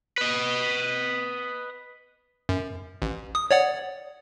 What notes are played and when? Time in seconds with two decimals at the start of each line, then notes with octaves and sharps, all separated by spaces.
0.18 B4 D#5
2.49 F#2
3.02 A1
3.35 D#6
3.51 C#5 D5 F#5